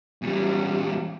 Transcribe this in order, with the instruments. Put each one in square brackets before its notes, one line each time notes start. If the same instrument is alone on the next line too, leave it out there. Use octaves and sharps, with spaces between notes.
[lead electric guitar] E2 G3